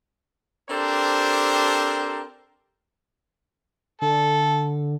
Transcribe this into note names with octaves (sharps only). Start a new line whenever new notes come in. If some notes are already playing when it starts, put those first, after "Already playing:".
C4 D4 G4 A4 A#4 C5
D3 A4